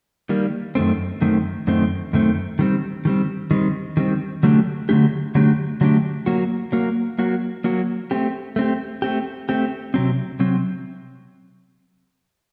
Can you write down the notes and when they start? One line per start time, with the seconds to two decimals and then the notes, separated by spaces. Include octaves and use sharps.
0.29 D#3 G3 A#3
0.75 F#2 D#3 A3 C4
1.21 F#2 D#3 A3 C4
1.67 F#2 D#3 A3 C4
2.13 F#2 D#3 A3 C4
2.59 D#3 G3 C4
3.05 D#3 G3 C4
3.51 D#3 G3 C4
3.97 D#3 G3 C4
4.43 D3 F#3 A3 D4 G4
4.89 D3 F#3 A3 D4 G4
5.35 D3 F#3 A3 D4 G4
5.81 D3 F#3 A3 D4 G4
6.26 F#3 A#3 F#4
6.72 F#3 A#3 F#4
7.19 F#3 A#3 F#4
7.64 F#3 A#3 F#4
8.11 A3 C4 G4
8.56 A3 C4 G4
9.02 A3 C4 G4
9.49 A3 C4 G4
9.94 C3 F#3 C4
10.39 C3 F#3 C4